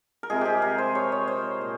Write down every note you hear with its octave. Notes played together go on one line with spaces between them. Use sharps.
A#4
C3 F3 G#3 G#4
G4 G#4
A#4
C5
C#5
C#5
C5
A#2